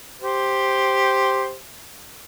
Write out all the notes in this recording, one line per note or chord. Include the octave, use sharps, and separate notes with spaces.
G4 C5